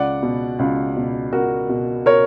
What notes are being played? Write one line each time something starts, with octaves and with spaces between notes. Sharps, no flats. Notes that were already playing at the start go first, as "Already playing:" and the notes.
Already playing: C#2 D5 F#5
B2
C#2
B2
C#2 F#4 A#4
B2
A#4 C#5